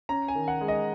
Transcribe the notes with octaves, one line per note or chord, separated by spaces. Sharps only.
C#4 A#5
G#5
D#3
F#5
G#3
D#5